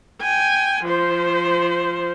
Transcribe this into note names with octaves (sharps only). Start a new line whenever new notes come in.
G5 G#5
F3 C5